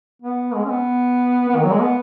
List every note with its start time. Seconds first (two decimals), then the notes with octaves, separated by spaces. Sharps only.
0.22 B3
0.54 G#3
0.64 C#4
0.70 B3
1.49 B3
1.56 D#3
1.64 F#3
1.72 G#3
1.81 B3